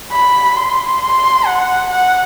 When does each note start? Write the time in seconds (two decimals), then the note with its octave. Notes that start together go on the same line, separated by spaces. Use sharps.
0.12 B5
0.56 C6
1.01 C6
1.46 F#5
1.90 F#5